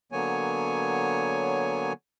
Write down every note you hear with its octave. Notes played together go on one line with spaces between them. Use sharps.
D3 F#3 A#3 B3 C#5 G#5